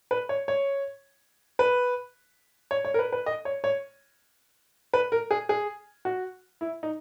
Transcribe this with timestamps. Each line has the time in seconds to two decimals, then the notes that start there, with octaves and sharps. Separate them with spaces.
0.11 B4
0.29 C#5
0.48 C#5
1.59 B4
2.71 C#5
2.85 C#5
2.94 A#4
2.99 B4
3.12 B4
3.26 D#5
3.45 C#5
3.64 C#5
4.94 B4
5.12 A#4
5.31 G#4
5.49 G#4
6.05 F#4
6.61 E4
6.83 D#4